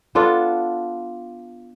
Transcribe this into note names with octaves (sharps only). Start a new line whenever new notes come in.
B3 D4 F4 A4